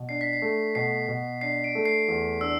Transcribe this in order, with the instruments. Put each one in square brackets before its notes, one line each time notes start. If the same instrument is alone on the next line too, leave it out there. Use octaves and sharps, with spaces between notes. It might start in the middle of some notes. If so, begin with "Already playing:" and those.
Already playing: [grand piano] B2
[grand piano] D4 [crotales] C7
[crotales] B6
C7
[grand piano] A3
[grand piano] B2 [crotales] C7
[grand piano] B2
[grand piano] D4 [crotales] C7
[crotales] D7
[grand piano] A3
[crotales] C7
[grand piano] E2
[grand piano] D4 [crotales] E6